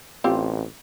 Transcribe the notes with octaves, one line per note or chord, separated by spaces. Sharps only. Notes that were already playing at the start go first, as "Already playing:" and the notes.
A1 C4 F4 G4